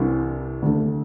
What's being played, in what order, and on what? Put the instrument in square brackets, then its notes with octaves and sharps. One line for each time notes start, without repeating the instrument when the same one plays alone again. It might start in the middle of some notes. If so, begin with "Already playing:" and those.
Already playing: [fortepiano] C2 C3 E3 G3 D4
D2 D3 A3